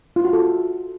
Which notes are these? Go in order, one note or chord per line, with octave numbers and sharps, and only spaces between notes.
F4
F#4
A4